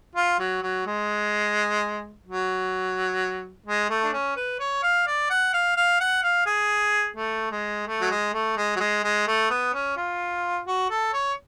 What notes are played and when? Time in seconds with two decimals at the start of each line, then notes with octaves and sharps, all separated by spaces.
0.16 F4
0.39 F#3
0.63 F#3
0.86 G#3
2.26 F#3
3.66 G#3
3.90 A3
4.04 D4
4.12 C#4
4.36 B4
4.60 C#5
4.83 F5
5.07 D5
5.30 F#5
5.53 F5
5.76 F5
6.00 F#5
6.23 F5
6.46 G#4
7.16 A3
7.51 G#3
7.87 A3
8.01 F#3
8.10 G#3
8.33 A3
8.56 G#3
8.76 F#3
8.80 G#3
9.04 G#3
9.27 A3
9.50 B3
9.74 C#4
9.97 F4
10.67 F#4
10.90 A4
11.13 C#5